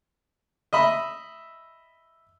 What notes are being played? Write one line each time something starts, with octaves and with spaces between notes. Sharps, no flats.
D#5 E5 B5